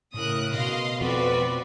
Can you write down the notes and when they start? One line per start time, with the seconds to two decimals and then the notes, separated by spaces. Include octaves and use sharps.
0.14 A2 C#3 A3 A#4 D#6 F#6
0.54 B2 D#5 F5 C6
1.01 F2 C4 F4 F#4 B4 D5